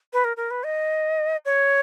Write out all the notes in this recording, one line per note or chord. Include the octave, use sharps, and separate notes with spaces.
B4
A#4
A#4
B4
D#5
C#5